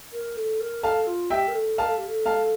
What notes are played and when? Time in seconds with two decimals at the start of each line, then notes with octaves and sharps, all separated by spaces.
0.12 A#4
0.37 A4
0.60 A#4
0.83 A4 F5 A5
1.07 F4
1.30 G4 E5 G5
1.48 A#4
1.54 A4
1.78 A#4 F5 A5
1.88 A4
1.98 G4
2.08 A4
2.26 F5 A5